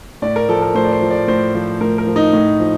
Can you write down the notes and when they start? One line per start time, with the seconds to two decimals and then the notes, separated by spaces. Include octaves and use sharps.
0.22 A2 D5
0.36 A#4
0.49 F3 A4
0.62 A#4
0.75 A2 C5
0.84 D5
0.93 C5
1.01 F3
1.11 D5
1.28 A2 C5
1.55 F3
1.80 A2 A#4
1.98 A#4
2.07 F3
2.16 D#4
2.33 A2
2.60 F3